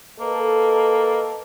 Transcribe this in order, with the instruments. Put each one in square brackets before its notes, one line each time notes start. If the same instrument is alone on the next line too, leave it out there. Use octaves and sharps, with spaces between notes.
[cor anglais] A#3 [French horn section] A4 B4 D#5